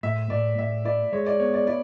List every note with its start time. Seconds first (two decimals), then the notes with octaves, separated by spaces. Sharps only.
0.03 A2 E5
0.30 A2 D5
0.58 A2 E5
0.85 E4 D5
1.12 G#3 C#5
1.26 D5
1.40 B3 C#5
1.54 D5
1.67 E4 D5